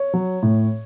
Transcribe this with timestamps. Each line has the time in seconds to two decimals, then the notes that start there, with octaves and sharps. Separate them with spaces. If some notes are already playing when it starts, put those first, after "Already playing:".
Already playing: C#5
0.14 F#3
0.43 A2